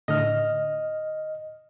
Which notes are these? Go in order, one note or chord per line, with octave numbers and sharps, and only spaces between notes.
A2 D3 D#5 F6